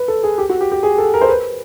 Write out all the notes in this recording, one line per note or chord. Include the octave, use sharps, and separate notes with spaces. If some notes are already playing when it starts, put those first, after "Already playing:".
Already playing: B4
A4
G#4
G4
F#4
G4
G4
G#4
A4
A#4
C5
B4